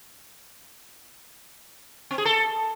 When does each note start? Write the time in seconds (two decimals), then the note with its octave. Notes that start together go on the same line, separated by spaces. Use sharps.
2.11 C4
2.18 G#4
2.25 A4